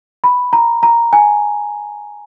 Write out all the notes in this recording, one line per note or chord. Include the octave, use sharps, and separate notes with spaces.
B5
A#5
A#5
G#5